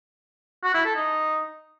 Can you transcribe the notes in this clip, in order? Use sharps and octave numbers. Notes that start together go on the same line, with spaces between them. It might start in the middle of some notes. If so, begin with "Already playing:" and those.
F#4
E4
A4
D#4